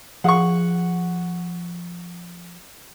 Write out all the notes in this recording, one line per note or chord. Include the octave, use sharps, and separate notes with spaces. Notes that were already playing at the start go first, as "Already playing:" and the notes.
F3 G#4 F5 F#5 C#6